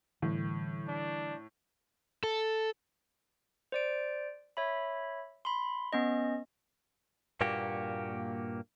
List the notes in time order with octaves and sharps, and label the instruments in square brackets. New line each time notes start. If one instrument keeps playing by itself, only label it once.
[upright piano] A2 [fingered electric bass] D3 E3 G3
[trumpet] D4
[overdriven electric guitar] A4
[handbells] C5 D5 D7
C#5 E5 B5
B5 C6
B3 C#4 D#5
[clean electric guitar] G2 A#2 A#3 F#4 G4